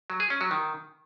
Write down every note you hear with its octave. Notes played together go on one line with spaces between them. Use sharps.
F#3
G#4
C#4
F#3
D#3